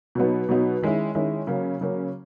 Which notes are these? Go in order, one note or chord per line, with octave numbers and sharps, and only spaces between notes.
B2 F#3 B3 D#4
B2 F#3 B3 D#4
D#3 G#3 C#4 E4
D#3 G#3 C#4 E4
C#3 F#3 A#3 C#4
C#3 F#3 A#3 C#4